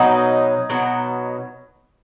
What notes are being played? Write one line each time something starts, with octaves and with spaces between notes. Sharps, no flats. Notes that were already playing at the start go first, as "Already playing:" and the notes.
Already playing: B2 F#3 D#4
B2 F#3